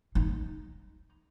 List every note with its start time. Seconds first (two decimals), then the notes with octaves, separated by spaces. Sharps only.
0.15 D#4